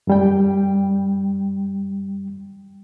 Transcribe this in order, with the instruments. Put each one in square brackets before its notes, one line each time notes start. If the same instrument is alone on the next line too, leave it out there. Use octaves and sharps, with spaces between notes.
[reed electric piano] F#2 G3 G5